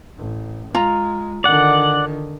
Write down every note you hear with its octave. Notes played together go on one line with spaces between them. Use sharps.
A1
G#3 F4 A#5
D3 D#3 D5 F#5